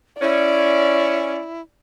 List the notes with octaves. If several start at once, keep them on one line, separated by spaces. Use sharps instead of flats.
C#4 E4 D5